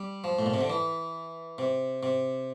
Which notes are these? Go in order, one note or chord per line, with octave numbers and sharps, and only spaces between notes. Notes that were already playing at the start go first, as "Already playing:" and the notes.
Already playing: G3
F3
A2
A#2
C3
D3
E3
C3
C3